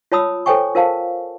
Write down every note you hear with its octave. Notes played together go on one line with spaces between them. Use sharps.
F4 C#5 A5 B5 D#6 E6
A4 C5 C#5 G5 G#5 C#6
F4 A#4 C5 F5 A5